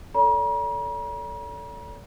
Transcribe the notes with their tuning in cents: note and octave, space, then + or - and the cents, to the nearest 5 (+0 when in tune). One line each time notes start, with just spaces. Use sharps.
A4 +0 D5 -45 A#5 +45